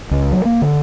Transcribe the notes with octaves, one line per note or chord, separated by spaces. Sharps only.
C#2
F#3
A#3
D3